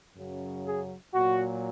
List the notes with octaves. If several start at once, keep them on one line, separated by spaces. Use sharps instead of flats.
F#2 C#3 F#3
G#4
A#2 F#3 F#4